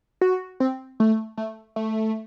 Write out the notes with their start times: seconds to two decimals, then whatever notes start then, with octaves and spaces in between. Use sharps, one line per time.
0.21 F#4
0.60 C4
1.00 A3
1.37 A3
1.76 A3